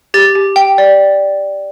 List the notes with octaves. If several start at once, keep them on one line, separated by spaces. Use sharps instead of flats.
G4 A6
G4
G5
D5